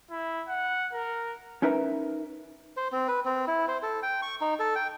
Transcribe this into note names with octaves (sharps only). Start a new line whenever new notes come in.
E4
F#5
A#4
C#4 D#4 A#4 B4 E5 A#5
C5
C4
B4
C4
E4
C5
A4
G5
C#6
D#4
A4
G5